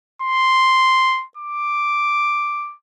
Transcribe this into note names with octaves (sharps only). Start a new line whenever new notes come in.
C6
D6